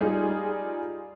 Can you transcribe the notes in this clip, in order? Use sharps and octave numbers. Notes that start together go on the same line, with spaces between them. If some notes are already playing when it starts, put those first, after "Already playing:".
G3 D#4 F4 G#4